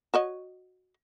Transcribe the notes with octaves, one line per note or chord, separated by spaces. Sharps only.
F#4 C#5 D#5